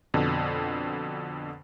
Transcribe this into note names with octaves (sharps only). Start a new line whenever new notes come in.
F2 B2 D3